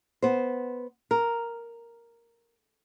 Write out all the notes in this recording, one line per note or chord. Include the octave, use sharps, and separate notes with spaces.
B3 C5
A#4